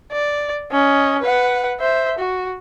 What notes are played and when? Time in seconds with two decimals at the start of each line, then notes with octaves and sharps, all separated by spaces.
0.12 D5
0.72 C#4 D#5
1.22 B4 F#5
1.80 C5 E5
2.19 F#4